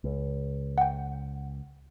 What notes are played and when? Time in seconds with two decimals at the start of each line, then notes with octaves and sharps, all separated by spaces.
0.04 C#2
0.78 F#5 G5